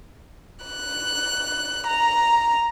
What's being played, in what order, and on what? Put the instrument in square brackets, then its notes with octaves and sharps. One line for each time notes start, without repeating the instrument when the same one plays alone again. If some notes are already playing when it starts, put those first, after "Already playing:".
[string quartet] F#6
A#5